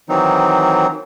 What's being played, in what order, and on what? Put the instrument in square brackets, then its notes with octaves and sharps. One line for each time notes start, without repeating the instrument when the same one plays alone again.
[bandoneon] D#3 E3 F#3 C4 D#4